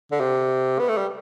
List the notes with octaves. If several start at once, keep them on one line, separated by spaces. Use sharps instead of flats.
D3
C3
B3
A3
G3